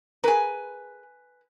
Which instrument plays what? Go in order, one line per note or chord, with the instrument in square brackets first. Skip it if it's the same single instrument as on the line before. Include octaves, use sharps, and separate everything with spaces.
[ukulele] G#4 A#4 [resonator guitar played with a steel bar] B4 G#5